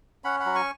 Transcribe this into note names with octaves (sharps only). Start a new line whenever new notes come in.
C#4 F#5 B5
F#5 B5
F#3
G#5 C#6